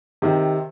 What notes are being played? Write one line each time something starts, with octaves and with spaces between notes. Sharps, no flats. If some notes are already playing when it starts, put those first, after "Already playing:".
C3 D#3